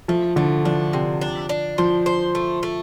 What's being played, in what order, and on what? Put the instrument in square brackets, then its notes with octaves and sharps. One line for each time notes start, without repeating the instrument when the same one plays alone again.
[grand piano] F3 [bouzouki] A3
[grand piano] D3 [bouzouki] A3
[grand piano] F3 [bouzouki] D4
[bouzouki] C3
D4
D4
[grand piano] F3 [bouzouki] C5
[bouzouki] C5
A3
A3